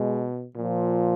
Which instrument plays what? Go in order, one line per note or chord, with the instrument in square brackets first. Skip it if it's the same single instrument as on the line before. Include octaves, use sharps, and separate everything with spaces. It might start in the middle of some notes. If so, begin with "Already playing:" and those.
Already playing: [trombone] B2 [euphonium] G#3
[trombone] A#2 [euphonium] F3